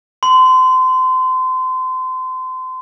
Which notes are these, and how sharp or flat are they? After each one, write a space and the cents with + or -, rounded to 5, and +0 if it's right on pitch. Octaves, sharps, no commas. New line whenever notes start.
C6 -30